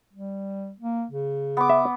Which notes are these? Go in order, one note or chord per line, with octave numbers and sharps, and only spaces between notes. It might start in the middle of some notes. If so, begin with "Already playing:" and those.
G3
A#3
C#3
B3 D6
E5